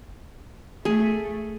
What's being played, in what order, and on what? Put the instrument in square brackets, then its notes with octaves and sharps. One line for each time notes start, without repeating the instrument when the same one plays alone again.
[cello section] A3 [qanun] G#4